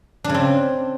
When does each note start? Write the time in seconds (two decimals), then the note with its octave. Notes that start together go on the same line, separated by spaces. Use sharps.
0.24 D4
0.29 C#3
0.34 C4